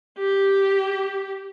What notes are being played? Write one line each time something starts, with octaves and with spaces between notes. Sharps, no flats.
G4